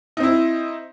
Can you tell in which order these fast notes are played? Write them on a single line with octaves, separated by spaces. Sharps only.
D#4 C4 E4